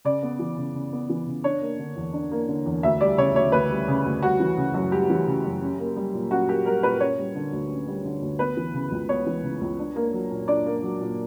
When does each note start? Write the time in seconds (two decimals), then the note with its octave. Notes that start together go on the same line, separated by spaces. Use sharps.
0.05 C#3 D5
0.23 B3
0.39 E3
0.57 C#3
0.75 C#3
0.93 B3
1.10 E3
1.27 C#3
1.44 D4 C#5
1.61 A#3
1.79 D3
1.96 E2
2.13 D4
2.31 A#3
2.49 D3
2.66 E2
2.83 D2 E5
3.01 G3 D5
3.18 C#3 C#5
3.35 D2 C#5
3.52 D2 B4
3.70 G3
3.88 C#3
4.05 D2
4.22 G3 F#4
4.40 E3
4.57 C#3
4.74 F#2
4.91 G3 G4
5.10 E3
5.27 C#3
5.44 F#2
5.61 C#4
5.79 A#3
5.96 G3
6.14 A#2
6.31 C#4 F#4
6.48 A#3 G4
6.66 G3 A#4
6.83 A#2 B4
7.00 C#4 C#5
7.18 G3
7.35 D3
7.52 D2
7.71 C#4
7.87 G3
8.05 D3
8.22 D2
8.39 B3 B4
8.57 E3
8.74 C#3
8.91 C#2
9.09 B3 C#5
9.26 E3
9.43 C#3
9.61 C#2
9.79 D4
9.96 A#3
10.13 F#3
10.31 A#2
10.47 D4 D5
10.66 A#3
10.83 F#3
11.01 A#2